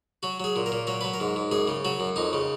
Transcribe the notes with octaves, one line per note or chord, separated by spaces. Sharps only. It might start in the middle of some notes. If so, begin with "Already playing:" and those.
F#3 F#4
F#3 G#4
A#2
A#4
A#2
F#3 A#4
F#3 B4
A#4
G#2
G#2
F#2 G#4
C#3
F#3 F#4
F#2
F2 D#4
C#3